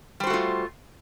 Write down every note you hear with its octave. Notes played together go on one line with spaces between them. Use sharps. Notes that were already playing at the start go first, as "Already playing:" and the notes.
G3 A3 F4 F#4 C5